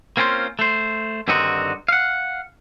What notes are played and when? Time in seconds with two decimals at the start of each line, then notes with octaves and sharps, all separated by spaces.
0.17 A#3 C4 C#4 F4 C5
0.59 A3 C5
1.28 G2 D3 D#3 C4 D#4 F#4
1.88 F5 F#5